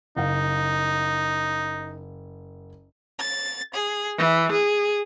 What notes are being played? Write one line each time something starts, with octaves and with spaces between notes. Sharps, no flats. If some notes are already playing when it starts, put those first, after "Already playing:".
F#1 D#4 F5
A6
G#4
E3
G#4